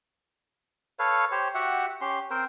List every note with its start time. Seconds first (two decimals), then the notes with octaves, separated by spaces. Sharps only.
0.99 A4 B4 C#5 F5
1.32 G4 C5 C#5
1.55 F#4 G4 E5 F#5
2.01 C#4 G4 C6
2.30 C4 A#4 C5 G5